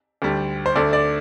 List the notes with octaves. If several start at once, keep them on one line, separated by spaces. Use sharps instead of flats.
D2 D3 G3
C5
D2 D3 A3 D5
D5